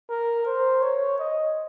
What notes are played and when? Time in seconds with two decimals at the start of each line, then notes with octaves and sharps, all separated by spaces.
0.09 A#4
0.46 C5
0.82 C#5
1.19 D#5